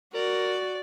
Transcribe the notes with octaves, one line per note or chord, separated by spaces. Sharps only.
F#4 A#4 D5